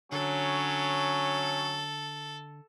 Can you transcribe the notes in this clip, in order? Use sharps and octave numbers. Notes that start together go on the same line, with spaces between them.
D3 F#3 C#4 A4